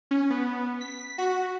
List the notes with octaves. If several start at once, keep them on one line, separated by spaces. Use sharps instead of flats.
C#4
B3
B6
F#4